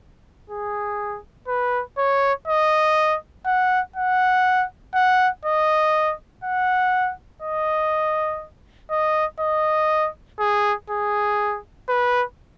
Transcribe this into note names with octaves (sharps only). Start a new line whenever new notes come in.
G#4
B4
C#5
D#5
F#5
F#5
F#5
D#5
F#5
D#5
D#5
D#5
G#4
G#4
B4